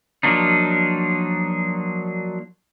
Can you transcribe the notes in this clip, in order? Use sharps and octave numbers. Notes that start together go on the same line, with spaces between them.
F3 F#3 A#3 D4 D#4